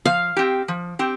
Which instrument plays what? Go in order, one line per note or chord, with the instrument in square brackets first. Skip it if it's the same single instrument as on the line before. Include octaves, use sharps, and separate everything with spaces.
[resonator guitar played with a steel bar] F3 [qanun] F5
[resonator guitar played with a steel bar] C4 G4
F3
C4 G4